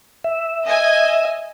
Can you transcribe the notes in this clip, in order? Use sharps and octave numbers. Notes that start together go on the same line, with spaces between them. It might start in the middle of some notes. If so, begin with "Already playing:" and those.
E5
D#5 G#5